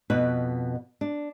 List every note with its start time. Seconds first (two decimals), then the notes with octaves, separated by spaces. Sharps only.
0.10 F2 B2 B4
1.01 D4